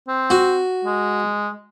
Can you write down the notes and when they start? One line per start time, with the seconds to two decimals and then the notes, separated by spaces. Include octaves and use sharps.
0.08 C4
0.30 F#4
0.85 G#3